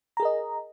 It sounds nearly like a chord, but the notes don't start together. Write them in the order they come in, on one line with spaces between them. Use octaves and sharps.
A#5 G#4 A#4 D#5